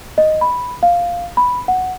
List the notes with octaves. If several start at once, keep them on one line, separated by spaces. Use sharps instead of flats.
D#5
B5
F5
B5
F#5